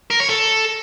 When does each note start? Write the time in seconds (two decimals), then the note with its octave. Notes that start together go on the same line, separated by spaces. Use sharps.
0.10 A#4
0.20 C#5
0.29 A4